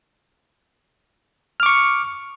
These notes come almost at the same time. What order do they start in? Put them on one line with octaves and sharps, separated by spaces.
F6 D6 C#6 C#7